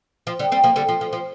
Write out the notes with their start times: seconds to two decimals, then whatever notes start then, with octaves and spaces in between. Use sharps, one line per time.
0.27 F3
0.39 D3 G3
0.52 G3 C4
0.64 F3 A#3
0.76 D3 G3
0.89 F3
1.01 F3
1.13 F3